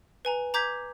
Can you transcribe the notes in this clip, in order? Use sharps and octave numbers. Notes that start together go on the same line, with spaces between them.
B4 G#5 A#5
A#5 D6 G6 G#6 B6